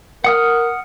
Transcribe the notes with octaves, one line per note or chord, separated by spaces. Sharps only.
A#4 F#5 D#6 F6